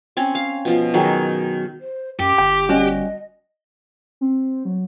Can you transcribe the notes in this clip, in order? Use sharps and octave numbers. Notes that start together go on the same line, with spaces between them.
C4 C#4 C#5
F5
B2 F3
D#3 F#3 G#4
C5
F#2 G4 D6
G1 G5
G3 C#4 F#4 D#5
C4
F#3